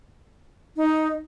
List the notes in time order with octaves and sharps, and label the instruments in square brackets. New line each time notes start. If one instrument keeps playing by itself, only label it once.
[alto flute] D#4